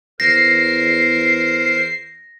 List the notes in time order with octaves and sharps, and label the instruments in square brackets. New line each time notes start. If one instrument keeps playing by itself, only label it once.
[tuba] E2 [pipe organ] A#4 C5 [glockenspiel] A#6 [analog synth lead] C7